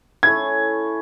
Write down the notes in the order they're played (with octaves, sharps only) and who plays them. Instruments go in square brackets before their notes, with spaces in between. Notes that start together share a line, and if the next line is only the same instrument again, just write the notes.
[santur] A3 C#4 E4 A4 [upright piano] G#6